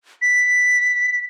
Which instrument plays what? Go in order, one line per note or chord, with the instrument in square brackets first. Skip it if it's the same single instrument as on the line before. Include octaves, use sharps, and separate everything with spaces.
[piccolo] B6